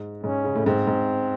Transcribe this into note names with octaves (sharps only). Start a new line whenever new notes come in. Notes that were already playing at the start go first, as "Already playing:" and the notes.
Already playing: G#2
G#2 C#4
C#3
A2
G#2 C4
G#2